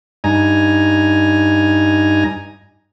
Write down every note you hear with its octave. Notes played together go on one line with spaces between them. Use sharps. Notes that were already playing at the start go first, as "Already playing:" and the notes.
G2 D#4 G#5 A#5